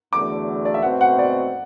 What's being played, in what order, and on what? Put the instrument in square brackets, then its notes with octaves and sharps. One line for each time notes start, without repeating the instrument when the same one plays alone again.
[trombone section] E2 D3 F#3 A3 [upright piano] D6
[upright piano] D5
E5
[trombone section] B2 A3 C4 F#4 B4 [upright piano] F#5
[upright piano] F#5
D5